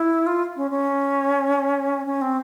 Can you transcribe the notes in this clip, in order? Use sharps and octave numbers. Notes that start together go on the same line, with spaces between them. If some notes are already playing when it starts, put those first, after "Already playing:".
Already playing: E4
F4
C#4
C#4
C#4
C4